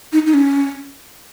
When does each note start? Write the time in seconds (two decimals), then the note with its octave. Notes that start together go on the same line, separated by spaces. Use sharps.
0.13 D#4
0.26 D#4
0.34 C#4